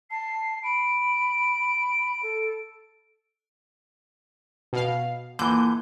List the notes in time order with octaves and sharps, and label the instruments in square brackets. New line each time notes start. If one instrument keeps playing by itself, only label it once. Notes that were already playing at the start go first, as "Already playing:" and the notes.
[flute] A5 [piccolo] C7
[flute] B5 [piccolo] D7
[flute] A4
[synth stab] B2 F5
[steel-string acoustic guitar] A#2 [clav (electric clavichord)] D3 E3 [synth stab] G6